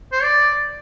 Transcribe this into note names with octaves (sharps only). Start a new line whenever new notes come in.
C5
D5